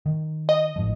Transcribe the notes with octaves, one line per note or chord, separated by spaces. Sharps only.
D#3
D#5
A1 G#2 F3